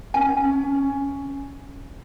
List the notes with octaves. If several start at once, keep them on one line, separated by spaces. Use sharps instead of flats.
C#4 G#5
C#4
C#4